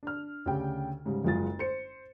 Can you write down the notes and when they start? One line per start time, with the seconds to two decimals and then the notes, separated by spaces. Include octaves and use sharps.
0.03 D4 F6
0.46 D2 C#3 G4 G5
1.06 G#2 C#3 G3
1.24 F#1 F#2 G#3 F4 F#4 A6
1.59 C5 C#7